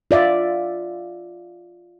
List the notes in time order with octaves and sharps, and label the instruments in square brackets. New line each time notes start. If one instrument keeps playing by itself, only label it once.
[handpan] F4 D5 E5